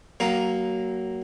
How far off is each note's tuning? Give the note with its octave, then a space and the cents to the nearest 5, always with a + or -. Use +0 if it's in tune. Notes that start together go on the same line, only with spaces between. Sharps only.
F#3 +20 A#3 +0